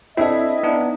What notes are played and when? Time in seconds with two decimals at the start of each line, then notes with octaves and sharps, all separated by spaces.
0.17 C4 D4 E4 A4 D#5
0.63 B3 D4 D#4